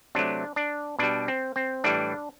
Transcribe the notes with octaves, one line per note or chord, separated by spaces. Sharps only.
C3 F#3 A3 D4
D4
B2 G3 D4
C4
C4
A2 E3 G3 D4